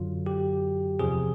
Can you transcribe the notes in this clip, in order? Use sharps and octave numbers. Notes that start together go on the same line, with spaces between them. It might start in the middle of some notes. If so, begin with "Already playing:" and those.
Already playing: F#2 D3 F#3 F4
G4
E2 C3 F3 G#4